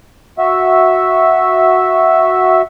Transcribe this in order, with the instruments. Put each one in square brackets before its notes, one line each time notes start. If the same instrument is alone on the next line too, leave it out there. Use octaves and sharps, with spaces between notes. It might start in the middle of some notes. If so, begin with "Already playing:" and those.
[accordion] F#4 E5